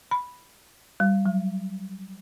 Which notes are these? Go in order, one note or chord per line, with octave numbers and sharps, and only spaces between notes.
B5
G3
F#3